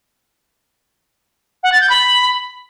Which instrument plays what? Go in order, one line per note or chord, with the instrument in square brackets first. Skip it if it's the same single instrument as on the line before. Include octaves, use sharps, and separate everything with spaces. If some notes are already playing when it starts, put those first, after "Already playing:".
[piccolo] F#5
A6
G6
B5